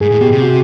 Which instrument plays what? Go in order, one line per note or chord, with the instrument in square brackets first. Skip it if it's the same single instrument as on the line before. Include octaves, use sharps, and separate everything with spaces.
[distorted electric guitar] G#2 [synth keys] G#4
[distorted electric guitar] A2
[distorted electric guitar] B2 [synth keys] G4
[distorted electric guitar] C3
[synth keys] F#4